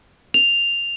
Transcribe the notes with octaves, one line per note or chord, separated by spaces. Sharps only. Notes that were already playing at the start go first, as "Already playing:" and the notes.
F7